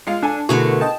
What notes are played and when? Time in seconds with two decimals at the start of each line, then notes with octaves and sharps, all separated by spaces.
0.07 G#3 F4 F5
0.22 D4 A4 G#5
0.49 B2 D3 A3 E4 F#4 G#4 A#4 B4
0.81 D#5 G5 A5